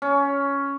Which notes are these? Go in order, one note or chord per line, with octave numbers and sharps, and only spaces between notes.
C#4